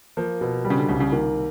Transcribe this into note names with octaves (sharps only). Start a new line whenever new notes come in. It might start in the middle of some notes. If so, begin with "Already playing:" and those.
F3 A#3
B2
G3
C#3
D3
C2 C#3
C#3
D#3 A#3